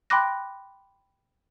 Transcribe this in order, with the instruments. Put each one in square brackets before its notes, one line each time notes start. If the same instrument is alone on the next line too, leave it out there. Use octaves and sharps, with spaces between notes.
[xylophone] G5 B5 C6 D6 F#6 A#6